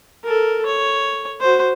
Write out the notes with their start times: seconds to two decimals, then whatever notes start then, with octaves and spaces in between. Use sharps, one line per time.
0.24 A4 A#4
0.66 C#5
1.40 F#4 C5